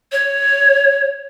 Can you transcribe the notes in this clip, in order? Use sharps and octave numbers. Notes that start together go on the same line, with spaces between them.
C#5